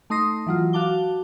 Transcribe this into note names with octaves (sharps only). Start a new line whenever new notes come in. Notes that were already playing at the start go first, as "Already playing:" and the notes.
A3 D#4 C6 D#6 A#6 C7
E3 F#3 F4
F#4 F5 A5 D6 G7